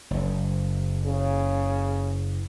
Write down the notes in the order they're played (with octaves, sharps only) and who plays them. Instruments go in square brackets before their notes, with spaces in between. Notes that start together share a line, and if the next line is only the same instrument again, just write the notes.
[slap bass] F#1
[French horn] C#3